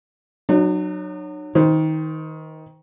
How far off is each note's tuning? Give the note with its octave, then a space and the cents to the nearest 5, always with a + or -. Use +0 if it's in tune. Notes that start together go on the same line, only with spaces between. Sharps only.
F#3 +0 D#4 -45
D#3 +20 C5 -20